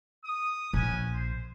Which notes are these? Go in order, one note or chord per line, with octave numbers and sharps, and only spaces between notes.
D#6
A#1 C#4 B4 G#5
C5